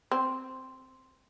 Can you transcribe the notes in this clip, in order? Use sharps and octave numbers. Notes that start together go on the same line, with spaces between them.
C4